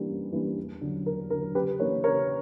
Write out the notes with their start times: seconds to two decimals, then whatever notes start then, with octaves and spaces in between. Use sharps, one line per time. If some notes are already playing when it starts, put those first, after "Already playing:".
Already playing: E3 G3 A#3 D4
0.08 F#2
0.32 E3 G3 A#3 D4
0.57 E2
0.81 D3 F#3
1.06 E2 A#4
1.30 D3 A#4
1.34 F#3
1.55 C#3 G4 B4
1.79 E3 A#3 D4 A#4 C#5
2.04 C#3 A#4 C#5